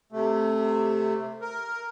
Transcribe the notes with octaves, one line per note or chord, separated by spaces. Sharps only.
C3 A3
A#4